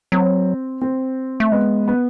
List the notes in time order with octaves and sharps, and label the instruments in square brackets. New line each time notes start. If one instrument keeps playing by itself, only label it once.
[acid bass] F#3 [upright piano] C4
[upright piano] C4
[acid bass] A3
[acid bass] G#3 [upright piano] B3
[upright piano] B3